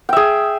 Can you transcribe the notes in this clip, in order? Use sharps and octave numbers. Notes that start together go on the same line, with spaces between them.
G#4 E5 G5